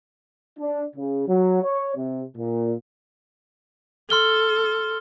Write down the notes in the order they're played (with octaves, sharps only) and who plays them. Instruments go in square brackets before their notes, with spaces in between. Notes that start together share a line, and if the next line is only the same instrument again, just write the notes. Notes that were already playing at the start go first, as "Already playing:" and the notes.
[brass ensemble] D4
C#3
F#3
C#5
C3
A#2
[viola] A4 [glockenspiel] C6 F6 G7